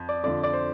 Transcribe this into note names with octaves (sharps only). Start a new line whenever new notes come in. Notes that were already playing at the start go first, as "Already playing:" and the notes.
Already playing: F2
D5
F2 D3 D5
D5
C5